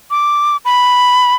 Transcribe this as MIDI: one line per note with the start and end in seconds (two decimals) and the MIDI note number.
0.11 0.57 86
0.65 1.35 83